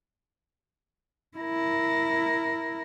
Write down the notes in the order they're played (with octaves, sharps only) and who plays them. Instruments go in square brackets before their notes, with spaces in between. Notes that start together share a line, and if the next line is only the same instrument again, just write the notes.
[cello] E4 A#4